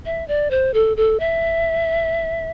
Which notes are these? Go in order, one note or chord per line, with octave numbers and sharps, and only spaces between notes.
E5
D5
C5
A4
A4
E5